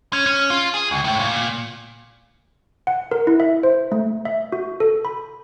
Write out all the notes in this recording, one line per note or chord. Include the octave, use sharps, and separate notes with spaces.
C#4
C#4
F4
G#4
C#2
A2
A#2
F#5
A#4
E4
E5
C5
A3
E5
F#4
A4
B5